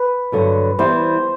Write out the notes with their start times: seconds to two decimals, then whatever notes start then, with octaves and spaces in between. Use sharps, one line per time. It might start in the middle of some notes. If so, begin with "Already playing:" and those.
Already playing: B4
0.32 G2 D3 F#3
0.79 E3 G3 B3 E4 C5